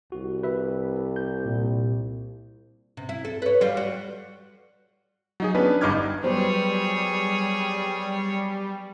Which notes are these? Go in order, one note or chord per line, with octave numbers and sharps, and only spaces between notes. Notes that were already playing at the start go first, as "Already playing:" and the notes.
C2 F#4
B4 E5
G6
A#2
C3
E4
A4
B4 C#5
G3 F4
F#4
F#3 D#4 G#4
B3 C#4 D4 B4
G1 G2 D#4 D6 F6 G#6
F#3 G3 B3 G#4 C5 C#5